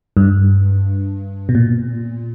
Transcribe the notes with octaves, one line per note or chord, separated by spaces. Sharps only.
G2
B2
A#2